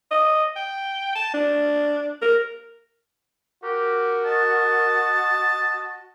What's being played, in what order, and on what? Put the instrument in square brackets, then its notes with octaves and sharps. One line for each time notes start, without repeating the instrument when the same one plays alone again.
[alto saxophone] D#5
G5
A5
D4
A#4
[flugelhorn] F#4 [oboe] G4 [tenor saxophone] A#4
[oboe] D#5 [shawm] A5